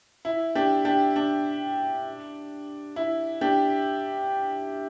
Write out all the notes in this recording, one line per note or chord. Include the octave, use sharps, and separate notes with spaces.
E4
D4 G4
D4 G4
D4
E4
D4 G4